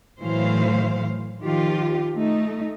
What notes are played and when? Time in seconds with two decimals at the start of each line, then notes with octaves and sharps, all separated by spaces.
0.21 A2 E3 F#3 A3 C5 F5
1.41 D#3 F3 F4 G4
2.18 A3 D#4